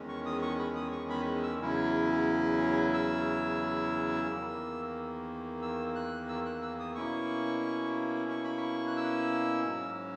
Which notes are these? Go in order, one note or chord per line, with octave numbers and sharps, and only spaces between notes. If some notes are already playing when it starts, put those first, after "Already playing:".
Already playing: E2 D#3 G#3 C#4
C#6
D#6
C#6
B5
D#6
C#6
B5
E6
E2 C#3 F#3 C#4 E4
E6
E2 D#3 A#3
E6
F#6
E6
F#6
E6
D#6
B2 A#3 C#4 E4 C#6
C#6
B5
C#6
F#6
E6
G#2 F#3 C#4